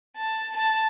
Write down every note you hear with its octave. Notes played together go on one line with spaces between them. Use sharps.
A5
A5